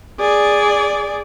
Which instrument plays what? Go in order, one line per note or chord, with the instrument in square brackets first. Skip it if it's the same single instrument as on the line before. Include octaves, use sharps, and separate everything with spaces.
[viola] G#4 D5